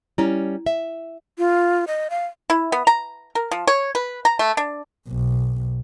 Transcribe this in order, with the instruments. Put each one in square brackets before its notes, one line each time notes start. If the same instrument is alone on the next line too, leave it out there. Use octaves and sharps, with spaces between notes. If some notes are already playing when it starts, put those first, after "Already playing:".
[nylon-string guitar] G3 C#4 [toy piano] E4
[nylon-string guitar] E5
[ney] F4
D#5
F5
[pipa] E4
B3
A#5
A#4
F3
C#5
B4
A#5
A3
D4
[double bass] B1